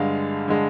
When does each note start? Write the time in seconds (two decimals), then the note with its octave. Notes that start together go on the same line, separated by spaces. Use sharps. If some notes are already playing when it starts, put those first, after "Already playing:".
Already playing: G2 D3 G#3 F5
0.48 D3 G#3